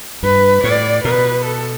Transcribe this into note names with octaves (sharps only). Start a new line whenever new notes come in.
G2 B4
A2 D5
B2 B4
A4